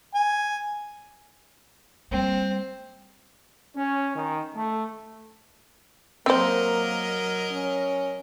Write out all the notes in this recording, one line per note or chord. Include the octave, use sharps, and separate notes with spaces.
G#5
G3 A#3 C4
C#4
D#3
A3
F#3 A#3 C4 A#4 C5 D#5
C#4